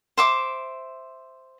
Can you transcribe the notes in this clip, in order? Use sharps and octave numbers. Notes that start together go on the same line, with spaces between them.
C5 E5 D6